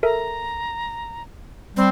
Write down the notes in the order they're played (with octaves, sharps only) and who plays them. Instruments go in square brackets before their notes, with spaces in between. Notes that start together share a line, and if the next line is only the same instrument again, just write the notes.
[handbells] A4 A#4 E5 [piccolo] A#5
[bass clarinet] G3 [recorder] C4